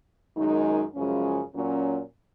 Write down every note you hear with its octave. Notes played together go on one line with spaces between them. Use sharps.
F#2 D#3 G#3 D#4
F#2 C#3 F3 G#3 C#4
A#2 F#3 C#4